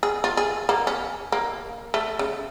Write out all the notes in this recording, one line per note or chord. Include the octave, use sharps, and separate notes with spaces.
G#4
F4
G#4
A#3
C#4
A#3
A3
C#3